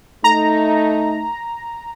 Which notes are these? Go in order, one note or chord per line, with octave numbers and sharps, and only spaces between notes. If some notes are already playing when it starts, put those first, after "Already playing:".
A3 D#4 A#5